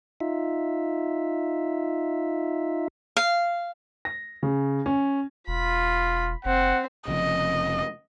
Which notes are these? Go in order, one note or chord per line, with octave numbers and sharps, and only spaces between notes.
D#4 F4 E5
F5
A#6
C#3
C#4
E1 F4 B5
F#1 C4 F#5
F1 F2 C#3 D#5